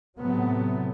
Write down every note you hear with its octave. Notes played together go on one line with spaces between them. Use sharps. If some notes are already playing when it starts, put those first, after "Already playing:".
A2 C3 F#3 A3 B3